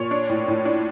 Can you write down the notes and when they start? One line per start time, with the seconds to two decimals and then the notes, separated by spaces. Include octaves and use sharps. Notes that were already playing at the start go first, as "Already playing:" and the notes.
Already playing: A#2 C#5
0.11 D4
0.29 A2
0.48 A2
0.65 D4